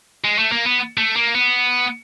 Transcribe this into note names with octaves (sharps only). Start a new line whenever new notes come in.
G#3
A3
A#3
B3
A3
A#3
B3